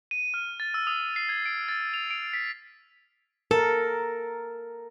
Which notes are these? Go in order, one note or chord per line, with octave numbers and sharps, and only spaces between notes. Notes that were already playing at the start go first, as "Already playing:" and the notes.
D#7
F6
A6
E6
D#6
C7
G#6
D7
A6
F7
D7
B6
A4 A#4